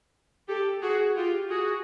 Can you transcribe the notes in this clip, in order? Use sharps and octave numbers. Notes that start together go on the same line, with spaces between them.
G4 A4
F#4 G#4
F4 G4
F#4 G#4